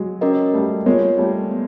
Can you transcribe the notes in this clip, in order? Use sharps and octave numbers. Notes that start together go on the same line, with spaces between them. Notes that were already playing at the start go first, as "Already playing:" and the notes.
Already playing: F#3 G#3
C#4 F#4 A#4 D#5
G3 A3
G#3 A#3 F4 A#4 C#5
G3 A3
B3